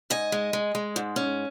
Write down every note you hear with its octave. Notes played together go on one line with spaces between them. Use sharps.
G#2 D#5 G#5
G#3
G#3
G#3
G#2
C#4